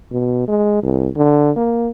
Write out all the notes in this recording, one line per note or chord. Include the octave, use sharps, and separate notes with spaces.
B2
G#3
C2
D3
A#3